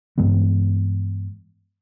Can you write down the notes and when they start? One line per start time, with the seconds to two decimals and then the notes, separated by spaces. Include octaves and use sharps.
0.18 G2 E3 G#3 B3